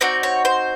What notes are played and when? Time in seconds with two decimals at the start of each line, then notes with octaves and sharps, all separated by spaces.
0.01 C4 D#4 F#4 D5
0.23 C#5
0.45 C5